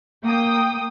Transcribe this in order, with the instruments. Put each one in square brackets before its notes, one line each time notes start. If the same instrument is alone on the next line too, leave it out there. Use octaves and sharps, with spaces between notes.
[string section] A#3 G5 D#6